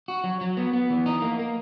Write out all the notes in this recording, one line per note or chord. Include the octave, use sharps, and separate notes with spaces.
F#4
F#3
F#3
B3
B3
E3
D#4
A#3
A#3